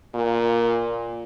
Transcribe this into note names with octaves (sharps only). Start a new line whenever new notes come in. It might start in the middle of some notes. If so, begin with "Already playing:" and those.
A#2